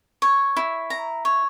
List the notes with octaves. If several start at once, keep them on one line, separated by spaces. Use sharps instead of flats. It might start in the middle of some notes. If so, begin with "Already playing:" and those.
C#5
E4
A#5
C#5